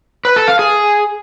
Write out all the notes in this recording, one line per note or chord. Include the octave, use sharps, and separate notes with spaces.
B4
A4
F5
G#4